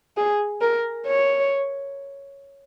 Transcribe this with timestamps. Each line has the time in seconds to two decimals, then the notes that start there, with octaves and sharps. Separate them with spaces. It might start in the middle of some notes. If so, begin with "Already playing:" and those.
0.17 G#4
0.61 A#4
1.06 C#5